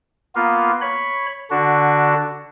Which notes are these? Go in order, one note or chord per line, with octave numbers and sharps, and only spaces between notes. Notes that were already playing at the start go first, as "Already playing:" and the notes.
A#3 B3 F4
C#5 B5
D3 D4 F#4